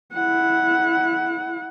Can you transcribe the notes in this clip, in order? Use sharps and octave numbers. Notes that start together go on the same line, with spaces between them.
E4 F#5